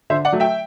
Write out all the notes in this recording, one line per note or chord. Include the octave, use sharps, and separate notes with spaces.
D3 C5 E5
D5 F#5
F#3 A3
E5 G5